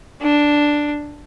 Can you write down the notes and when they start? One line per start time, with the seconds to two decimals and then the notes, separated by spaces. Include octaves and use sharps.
0.21 D4